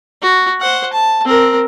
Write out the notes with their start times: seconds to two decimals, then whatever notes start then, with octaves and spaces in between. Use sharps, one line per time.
0.22 F#4
0.61 C5 F#5
0.93 A5
1.25 C4 A#4